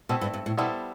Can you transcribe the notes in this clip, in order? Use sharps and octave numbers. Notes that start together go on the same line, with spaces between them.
B2 A3 C4 E4
G2
G2
A2
B2 G3 B3 E4 A4 C5